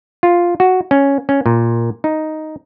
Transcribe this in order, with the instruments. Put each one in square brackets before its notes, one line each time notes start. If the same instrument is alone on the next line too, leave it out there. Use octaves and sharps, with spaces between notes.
[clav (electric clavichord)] F4
F#4
C#4
C#4
A#2
D#4